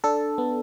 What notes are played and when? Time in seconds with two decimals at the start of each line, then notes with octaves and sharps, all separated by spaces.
0.04 D4 A4
0.38 B3